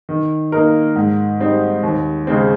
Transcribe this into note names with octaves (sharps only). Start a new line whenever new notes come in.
D#3
A#3 D#4 A#4
G#2
G3 C4 D#4
D#2
C#3 G#3 C4